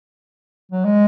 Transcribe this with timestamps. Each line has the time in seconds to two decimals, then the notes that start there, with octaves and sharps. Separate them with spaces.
0.72 F#3
0.84 G#3